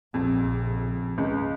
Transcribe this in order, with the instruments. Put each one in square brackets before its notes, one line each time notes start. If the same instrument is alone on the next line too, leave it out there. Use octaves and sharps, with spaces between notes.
[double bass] A#1 C#3 [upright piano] F2
[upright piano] C#2